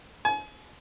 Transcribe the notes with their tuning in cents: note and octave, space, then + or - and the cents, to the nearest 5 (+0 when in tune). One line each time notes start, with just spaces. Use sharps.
G#5 +35